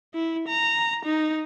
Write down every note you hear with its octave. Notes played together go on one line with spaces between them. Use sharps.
E4
A#5
D#4